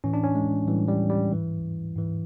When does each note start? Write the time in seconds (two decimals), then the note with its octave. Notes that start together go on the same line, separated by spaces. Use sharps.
0.04 A2 E3 C#4
0.13 D4
0.24 C#4
0.35 G#3
0.67 A2 E3 G3
0.88 G3
1.10 G3
1.31 G#2 E3
1.95 G#2 E3